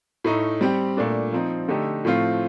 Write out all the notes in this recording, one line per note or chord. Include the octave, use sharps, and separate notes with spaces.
A2 A3 D#4
G3 C4 G4
A#2 A3 D4
F3 C4 D#4
D3 A3 D#4 G4
A2 F3 A3 C4 F4